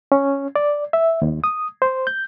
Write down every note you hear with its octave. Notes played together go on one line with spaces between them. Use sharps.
C#4
D5
E5
D#2
D#6
C5
G6